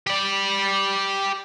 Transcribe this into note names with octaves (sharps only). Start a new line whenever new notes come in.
G4 D5